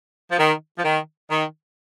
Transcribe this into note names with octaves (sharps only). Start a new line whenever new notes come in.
F3
D#3
F3
D#3
D#3